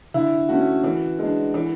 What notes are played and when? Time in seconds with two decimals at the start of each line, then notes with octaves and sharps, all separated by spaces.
0.14 D3 E4
0.49 A3 C#4 F#4
0.84 E3
1.19 G#3 D4
1.54 E3